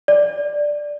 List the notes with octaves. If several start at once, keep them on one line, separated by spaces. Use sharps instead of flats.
D5